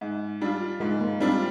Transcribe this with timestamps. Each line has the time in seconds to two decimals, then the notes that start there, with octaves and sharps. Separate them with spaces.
0.01 G#2
0.41 G3 D4 F4
0.80 G#2 G#3
1.00 A#3
1.20 G3 C4 D4 F4